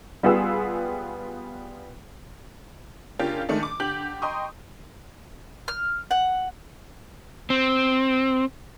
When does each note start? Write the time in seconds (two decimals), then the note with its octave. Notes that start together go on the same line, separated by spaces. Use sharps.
0.23 G3 B3 F4 G#4 E6
3.19 C#3 A#3 C#4 D4 F4 G4
3.49 D#3 G#3 A3 D4
3.63 D6
3.80 D3 G4 G6 F#7
4.22 D#5 G5 A#5 C6 C#6 D#6
5.68 F6
6.11 F#5
7.50 C4